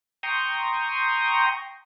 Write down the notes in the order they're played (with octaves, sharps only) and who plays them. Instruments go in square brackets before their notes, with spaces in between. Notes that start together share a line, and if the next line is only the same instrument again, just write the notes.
[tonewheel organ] G5 A#5 C6 C#6 D#6